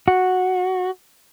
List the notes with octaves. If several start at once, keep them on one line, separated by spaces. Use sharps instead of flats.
F#4